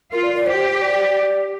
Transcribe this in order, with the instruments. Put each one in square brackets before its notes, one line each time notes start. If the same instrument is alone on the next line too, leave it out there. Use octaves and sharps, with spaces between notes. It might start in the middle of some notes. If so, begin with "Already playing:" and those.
[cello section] F4 [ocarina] A#4
[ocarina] D5
D5
[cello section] G4 [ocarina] C5
[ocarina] D5